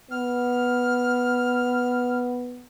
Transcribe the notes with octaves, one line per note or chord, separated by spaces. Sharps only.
B3 F6